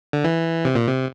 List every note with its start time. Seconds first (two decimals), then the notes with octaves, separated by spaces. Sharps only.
0.13 D3
0.24 E3
0.65 C3
0.75 A#2
0.87 C3